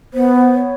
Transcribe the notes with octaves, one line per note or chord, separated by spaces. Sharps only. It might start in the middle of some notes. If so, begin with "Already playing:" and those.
B3 C5
C5
C#5